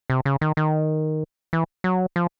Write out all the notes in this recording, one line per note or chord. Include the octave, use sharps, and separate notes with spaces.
C3
C#3
D#3
D#3
E3
F#3
F3